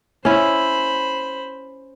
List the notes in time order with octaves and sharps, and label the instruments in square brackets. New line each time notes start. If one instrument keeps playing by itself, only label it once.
[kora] C#4 E4 [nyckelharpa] C5 B5